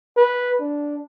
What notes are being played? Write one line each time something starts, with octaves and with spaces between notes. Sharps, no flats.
B4
D4